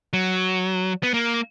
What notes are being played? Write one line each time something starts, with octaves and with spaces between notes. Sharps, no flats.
F#3
B3
A#3